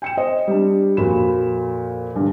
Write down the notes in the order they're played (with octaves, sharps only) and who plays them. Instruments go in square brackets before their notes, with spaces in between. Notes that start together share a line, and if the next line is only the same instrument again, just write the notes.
[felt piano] G5 C#7 E7
C5 D#5
G3 D4
F2 A#2 F#4 B5 E7
G2 D3